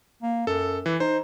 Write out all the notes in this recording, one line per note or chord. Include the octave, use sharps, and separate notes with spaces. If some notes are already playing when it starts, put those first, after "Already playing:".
A#3
F#2 A4
E3
D#4 C5